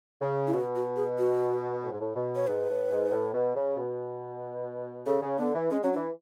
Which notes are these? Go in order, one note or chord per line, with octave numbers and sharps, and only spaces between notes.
C#3
E4
B2 F#4
F#4
G#4
F#4
A2
G#2
A2
B2
C#5
G#2 B4
A2
G#2
A2
B2
C#3
B2
C#3 A4
C#3
D3 B3
E3
G#3 C#4
F#3 C#4
D4
E3